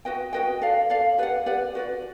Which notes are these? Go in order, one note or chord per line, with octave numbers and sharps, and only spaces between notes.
F#4 B4 D#5 G5
F#4 B4 D#5 G5
A4 D5 F5
A4 D5 F5
G4 B4 D5 F#5
G4 B4 D5 F#5
F#4 B4 D5